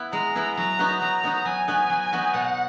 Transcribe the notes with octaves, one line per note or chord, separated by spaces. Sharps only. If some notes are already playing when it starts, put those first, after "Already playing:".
Already playing: B3 E4 B4
G#3 A#5
B3 E4 B4
F#3 A#5
B3 D#4 F#4 B4
F#3 A#5
B3 D#4 F#4 B4
F#3 G#5
B3 D#4 F#4 B4
F#3
B3 D#4 F#4 B4
B2 F#5